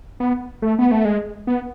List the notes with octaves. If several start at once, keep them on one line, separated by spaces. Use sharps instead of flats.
B3
A3
B3
A3
G#3
B3